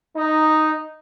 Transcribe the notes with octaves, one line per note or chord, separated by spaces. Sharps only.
D#4